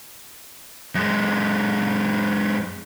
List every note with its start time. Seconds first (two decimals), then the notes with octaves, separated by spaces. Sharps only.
0.95 F#2 G#3